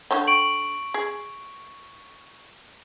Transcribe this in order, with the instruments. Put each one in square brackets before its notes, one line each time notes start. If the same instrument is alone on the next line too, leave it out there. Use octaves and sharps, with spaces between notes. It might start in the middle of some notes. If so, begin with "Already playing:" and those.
[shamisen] D3 C#5 G5
[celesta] C#6 D7 F#7
[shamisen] G#4